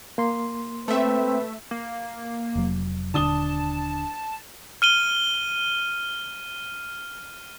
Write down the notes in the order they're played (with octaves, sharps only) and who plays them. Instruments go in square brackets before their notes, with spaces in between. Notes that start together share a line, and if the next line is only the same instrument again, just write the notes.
[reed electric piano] A#3 C6
[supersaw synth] A3 E5 [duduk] C4 [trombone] B4
[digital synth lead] A#3
[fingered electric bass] F1 F#3
[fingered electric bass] D#1 D3 [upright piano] D4 D#6 G7 [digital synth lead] A5
[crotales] F6 D#7 G7